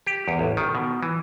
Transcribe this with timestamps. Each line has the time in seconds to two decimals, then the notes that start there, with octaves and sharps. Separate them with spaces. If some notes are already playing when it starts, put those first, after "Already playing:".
0.06 G4
0.28 E2
0.39 A1
0.57 D#3
0.75 B2
1.03 E3